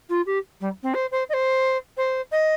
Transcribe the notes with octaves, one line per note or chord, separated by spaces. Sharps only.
F4
G4
G3
C4
C5
C5
D#5
C5
C5
D#5